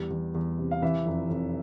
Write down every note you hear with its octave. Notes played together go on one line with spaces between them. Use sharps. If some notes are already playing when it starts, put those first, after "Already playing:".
Already playing: E2 G3
E2
E2
C3
F5
E3 E5
F1
F1